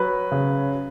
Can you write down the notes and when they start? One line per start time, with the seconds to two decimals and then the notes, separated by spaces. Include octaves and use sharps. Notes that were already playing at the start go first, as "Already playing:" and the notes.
Already playing: F#3 B4
0.31 C#3